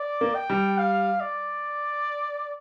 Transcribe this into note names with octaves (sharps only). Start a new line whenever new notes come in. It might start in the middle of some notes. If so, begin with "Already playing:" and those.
Already playing: D5
A#3
G5
G3
F5
D5